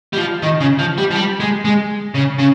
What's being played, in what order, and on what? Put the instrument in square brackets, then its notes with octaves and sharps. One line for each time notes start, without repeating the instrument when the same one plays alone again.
[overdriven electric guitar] G3
F3
D#3
C#3
F3
G3
F3
G3
G#3
G#3
C#3
C#3